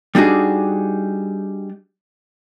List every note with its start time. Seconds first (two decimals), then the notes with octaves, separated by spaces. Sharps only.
0.15 G3 D4 D#4 F#4 G#4